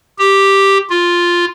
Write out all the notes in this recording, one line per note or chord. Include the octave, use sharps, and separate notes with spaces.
G4
F4